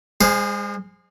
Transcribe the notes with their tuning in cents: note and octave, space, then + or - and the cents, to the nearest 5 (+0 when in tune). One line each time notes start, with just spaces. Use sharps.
G#3 -40 G#4 +0 C5 +0